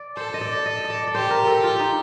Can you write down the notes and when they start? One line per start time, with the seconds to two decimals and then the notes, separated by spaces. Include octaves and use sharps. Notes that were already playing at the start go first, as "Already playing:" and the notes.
Already playing: D5
0.17 A4 C5
0.34 D#5
0.41 D5
0.66 D#5
0.84 D#5
0.90 D5
1.07 D5
1.14 G4 C5
1.31 A#4
1.47 A4
1.64 F4
1.79 D#4